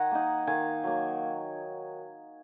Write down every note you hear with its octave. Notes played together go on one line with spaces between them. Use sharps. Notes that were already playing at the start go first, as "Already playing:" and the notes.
Already playing: D#3 F#5 G#5 A#5
A#3 D#4
D#3 F5 G#5
F#3 A#3